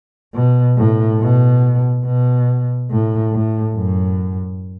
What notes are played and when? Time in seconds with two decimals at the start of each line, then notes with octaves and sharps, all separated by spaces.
0.34 B2
0.77 A2
1.20 B2
2.05 B2
2.90 A2
3.33 A2
3.76 F#2